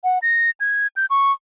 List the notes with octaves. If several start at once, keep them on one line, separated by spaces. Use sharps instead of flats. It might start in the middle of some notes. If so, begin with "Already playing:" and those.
F#5
A#6
G#6
G6
C#6